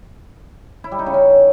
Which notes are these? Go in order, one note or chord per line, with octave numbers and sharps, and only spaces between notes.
E4
G3
D#4
C#3
C#4